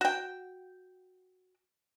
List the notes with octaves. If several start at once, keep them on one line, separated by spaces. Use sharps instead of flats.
F#4 G5